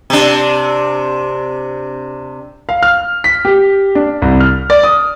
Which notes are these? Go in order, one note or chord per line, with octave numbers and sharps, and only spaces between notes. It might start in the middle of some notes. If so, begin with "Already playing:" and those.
C3 D4
F5
F6
B6
G4
D4
C2
F6
D5
D#6